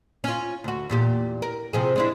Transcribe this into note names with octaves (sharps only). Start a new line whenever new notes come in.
C#4 F4
D2 F#4
E2 A#2 G4
A#4
C3 F3 G#4
G#3 D4 E4